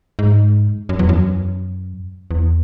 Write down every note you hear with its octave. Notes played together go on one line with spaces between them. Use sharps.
G#2
F#2
E2
F#2
E2